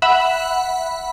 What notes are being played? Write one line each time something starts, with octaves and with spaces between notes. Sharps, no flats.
E5 F#5 B5